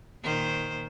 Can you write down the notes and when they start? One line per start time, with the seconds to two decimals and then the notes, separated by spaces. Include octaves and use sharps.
0.23 A#2 D#3 C5